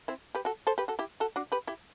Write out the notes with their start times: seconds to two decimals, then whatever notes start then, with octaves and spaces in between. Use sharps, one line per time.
0.08 C4 E4
0.35 G4 B4
0.45 F#4 A4
0.67 A4 C5
0.78 G4 B4
0.88 F#4 A4
0.99 E4 G4
1.20 F#4 A4
1.36 D4 F#4
1.52 G4 B4
1.67 E4 G4